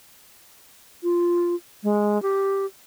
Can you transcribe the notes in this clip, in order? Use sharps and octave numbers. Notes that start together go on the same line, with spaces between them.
F4
G#3
G4